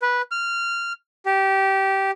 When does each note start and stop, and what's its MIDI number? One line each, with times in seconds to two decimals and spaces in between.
0.02 0.22 71
0.31 0.93 89
1.26 2.11 67